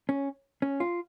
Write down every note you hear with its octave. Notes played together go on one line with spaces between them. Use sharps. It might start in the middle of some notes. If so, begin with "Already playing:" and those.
C#4
C#4
F4